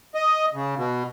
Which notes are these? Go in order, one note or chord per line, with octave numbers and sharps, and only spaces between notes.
D#5
C#3
B2